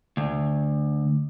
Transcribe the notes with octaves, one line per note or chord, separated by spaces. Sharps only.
D2